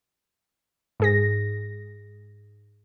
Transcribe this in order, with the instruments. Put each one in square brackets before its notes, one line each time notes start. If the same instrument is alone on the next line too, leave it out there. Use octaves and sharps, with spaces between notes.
[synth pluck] G#2 G#4 A#6